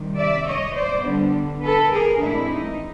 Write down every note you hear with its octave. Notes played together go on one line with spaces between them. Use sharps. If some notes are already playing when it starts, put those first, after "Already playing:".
Already playing: C3 D#3 G3
D5 E5
C#5 D#5
C5 D5
D3 G3 B3 D4
A4 B4
G#4 A#4
A2 E3 G#3 C4 D4 E4
D#4